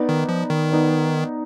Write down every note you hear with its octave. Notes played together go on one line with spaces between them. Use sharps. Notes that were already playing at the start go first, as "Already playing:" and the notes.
Already playing: B3 D#4 B4 D5
D#3
F3
D#3
B3 D#4 B4 D5